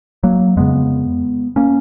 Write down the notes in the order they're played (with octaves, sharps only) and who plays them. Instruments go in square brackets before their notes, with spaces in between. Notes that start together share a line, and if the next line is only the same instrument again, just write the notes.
[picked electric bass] F#3 A#3
F2 C#3 G#3 B3
A#3 C#4